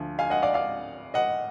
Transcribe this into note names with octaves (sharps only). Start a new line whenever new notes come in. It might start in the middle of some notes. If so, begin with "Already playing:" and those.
Already playing: D2 D3 F3
F5 G#5
D#5 F#5
D5 F5
D5 F5
D#5 F#5